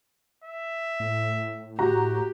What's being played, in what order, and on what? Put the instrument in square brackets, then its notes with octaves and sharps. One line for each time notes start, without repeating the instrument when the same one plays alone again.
[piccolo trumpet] E5
[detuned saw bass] A2
[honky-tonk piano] F#4 A#5 [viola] G4